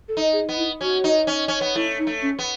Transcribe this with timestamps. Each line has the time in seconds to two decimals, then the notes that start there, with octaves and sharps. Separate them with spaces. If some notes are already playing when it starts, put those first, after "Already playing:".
0.09 A4
0.17 D#4
0.33 G#4
0.49 B3
0.57 E4
0.81 C#4 F#4
1.04 D#4
1.27 C#4
1.48 C#4
1.61 B3
1.75 A3 E4
1.99 D#4
2.07 A3
2.22 C#4
2.39 B3